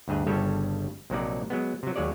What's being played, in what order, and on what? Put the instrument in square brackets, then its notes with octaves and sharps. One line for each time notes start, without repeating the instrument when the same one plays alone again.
[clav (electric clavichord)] D2 G2 G#4 D#5
G1 G2 C#3 G3 A4 C#5
A#1 C3 F#3 A#3 D#4 D5
F#3 G#3 B3
C3 F#3
D#2 F#3 G#3 C#5 D5